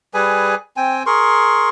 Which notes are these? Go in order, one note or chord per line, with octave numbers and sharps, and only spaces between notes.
G3 G#4 B4 G#5
C4 G5 G#5
G#4 A#4 C6 C#6